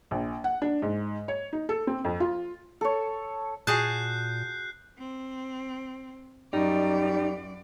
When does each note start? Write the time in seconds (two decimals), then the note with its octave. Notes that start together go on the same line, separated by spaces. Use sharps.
0.11 A#1
0.44 F#5
0.62 D4
0.82 G#2
1.28 C#5
1.53 D#4
1.69 A4
1.87 C4
2.04 F2
2.20 F4
2.81 A4 C#5
3.67 A#2 F#4 G#4 A5 F#6 G6 C7
4.99 C4
6.53 F#2 G3 D#4 D5